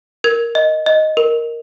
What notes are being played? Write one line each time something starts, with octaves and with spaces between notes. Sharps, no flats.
A#4 G#6
D#5
D#5
A#4